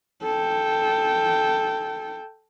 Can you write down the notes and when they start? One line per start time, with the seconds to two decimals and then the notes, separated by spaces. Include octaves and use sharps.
0.23 A4 G5